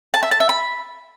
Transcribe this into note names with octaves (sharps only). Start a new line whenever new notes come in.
A5
E5
A5
E5
B5